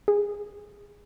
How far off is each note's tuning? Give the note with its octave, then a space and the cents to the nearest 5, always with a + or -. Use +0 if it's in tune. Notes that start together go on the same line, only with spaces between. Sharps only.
G#4 -20